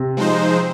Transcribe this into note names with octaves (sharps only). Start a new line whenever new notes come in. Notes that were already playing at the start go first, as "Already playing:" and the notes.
Already playing: C3
F3 G#3 D#4 C5